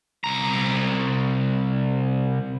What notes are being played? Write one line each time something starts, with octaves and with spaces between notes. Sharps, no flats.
C2 A#5